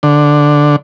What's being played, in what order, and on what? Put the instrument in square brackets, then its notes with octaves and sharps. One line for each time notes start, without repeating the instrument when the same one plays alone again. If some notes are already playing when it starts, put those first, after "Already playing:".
[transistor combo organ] D3